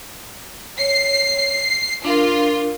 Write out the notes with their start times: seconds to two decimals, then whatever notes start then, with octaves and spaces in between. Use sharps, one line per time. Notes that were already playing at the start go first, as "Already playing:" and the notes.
0.79 C#5 C7
2.05 D4 F4 A#4